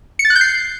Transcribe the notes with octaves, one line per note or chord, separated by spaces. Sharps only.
C#7
A6
F#6
G6
C7